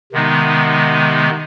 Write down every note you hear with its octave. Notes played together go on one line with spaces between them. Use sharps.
C3 D#3 G#3 B3 D#4